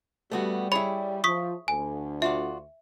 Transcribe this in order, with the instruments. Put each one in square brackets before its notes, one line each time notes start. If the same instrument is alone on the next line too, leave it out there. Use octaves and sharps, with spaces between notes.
[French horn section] G3 [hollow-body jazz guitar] A3 B3 F#4
[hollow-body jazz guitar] E4 G#4 C#5 [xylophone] B5
[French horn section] F3 [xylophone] C#6 D#6 B6
[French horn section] D2 [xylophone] G#5
[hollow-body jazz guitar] F4 F#4 D5 [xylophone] E5